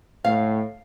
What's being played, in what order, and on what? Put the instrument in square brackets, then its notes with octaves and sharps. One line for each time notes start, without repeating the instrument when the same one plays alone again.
[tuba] A2 [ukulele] F5